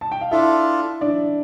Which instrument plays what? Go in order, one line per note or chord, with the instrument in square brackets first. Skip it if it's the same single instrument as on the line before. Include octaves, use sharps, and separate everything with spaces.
[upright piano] A5
G5
F5
[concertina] D4 F4 A4 [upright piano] E4 E5
[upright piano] D4 D5